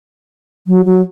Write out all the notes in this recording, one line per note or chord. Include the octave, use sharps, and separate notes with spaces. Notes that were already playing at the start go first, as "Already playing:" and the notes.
F#3
F#3